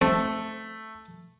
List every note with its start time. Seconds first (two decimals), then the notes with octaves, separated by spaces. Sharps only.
0.01 A3 C4